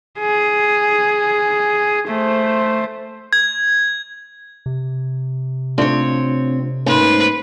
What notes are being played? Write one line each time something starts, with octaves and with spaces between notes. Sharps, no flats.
G#4
A3 C5
G#6
C3
A3 C4 D4 F4 C#5
G#2 A3 A#3 C#4 B4 C5